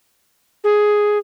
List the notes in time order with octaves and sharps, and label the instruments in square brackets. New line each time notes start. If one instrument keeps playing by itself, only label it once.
[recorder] G#4